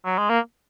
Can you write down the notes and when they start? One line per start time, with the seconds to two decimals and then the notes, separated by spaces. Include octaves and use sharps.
0.05 F#3
0.18 G#3
0.29 A#3